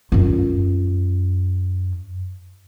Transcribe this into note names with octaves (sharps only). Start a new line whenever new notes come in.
F#2 F4